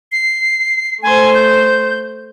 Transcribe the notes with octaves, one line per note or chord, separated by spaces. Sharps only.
C7
A3 C5 G#5
G6